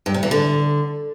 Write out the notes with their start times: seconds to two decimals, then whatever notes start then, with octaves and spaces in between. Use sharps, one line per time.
0.06 G2
0.14 C3
0.23 E3
0.31 D3